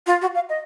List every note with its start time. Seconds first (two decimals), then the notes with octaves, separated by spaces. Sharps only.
0.07 F4
0.22 F#4
0.35 F5
0.49 D#5